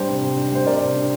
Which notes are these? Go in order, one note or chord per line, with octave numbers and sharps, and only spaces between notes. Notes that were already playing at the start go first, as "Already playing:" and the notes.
Already playing: G3 D4 C5
C3
C3
D4
G3 C5
C3 A#4 D5
C3
D4